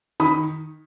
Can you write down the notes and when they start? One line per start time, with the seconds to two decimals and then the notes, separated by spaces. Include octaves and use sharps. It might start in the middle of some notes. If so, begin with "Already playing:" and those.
0.20 D#3 B5 D#6